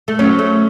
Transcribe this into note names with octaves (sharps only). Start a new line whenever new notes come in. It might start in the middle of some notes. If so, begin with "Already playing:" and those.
A3
F#3 C#4
A3